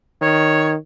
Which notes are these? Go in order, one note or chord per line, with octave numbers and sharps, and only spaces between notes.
D#3 C#5